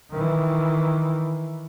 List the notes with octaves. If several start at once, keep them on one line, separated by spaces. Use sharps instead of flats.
D#3 E3